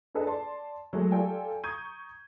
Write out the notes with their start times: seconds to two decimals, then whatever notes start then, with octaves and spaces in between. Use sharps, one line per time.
0.14 D4 G#4 A4 B4 D#5
0.26 D5 A5 C6
0.93 F#3 G#3 A3
1.11 F4 G4 A4 D5 G5 G#5
1.64 A#5 C#6 D#6 G6 G#6 D#7